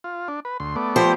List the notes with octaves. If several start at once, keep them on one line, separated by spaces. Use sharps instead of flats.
F4
D4
B4
D2 C6
A3 B3 D5
F3 G4 C5